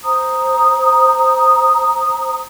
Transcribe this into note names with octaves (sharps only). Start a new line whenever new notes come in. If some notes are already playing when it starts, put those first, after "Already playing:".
C5 A#5 D#6